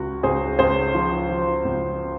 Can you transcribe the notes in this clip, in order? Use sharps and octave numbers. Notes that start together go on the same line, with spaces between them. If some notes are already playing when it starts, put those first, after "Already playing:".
Already playing: C#2 C#3 F#4
C#2 G#4 C5
C#2 G#4 C5
F3
F3
C#2